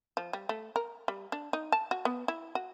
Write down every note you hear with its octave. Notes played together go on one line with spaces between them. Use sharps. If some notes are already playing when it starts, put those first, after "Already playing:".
F3
G3
A3
A#4
G3
D4
D#4
A5
F#4
B3
E4
F#4